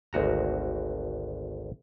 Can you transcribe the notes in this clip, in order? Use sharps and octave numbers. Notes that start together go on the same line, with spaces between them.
G#1 D2 F#4 A#5